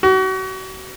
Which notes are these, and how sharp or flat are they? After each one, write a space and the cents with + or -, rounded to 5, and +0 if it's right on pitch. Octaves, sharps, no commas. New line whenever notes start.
F#4 +35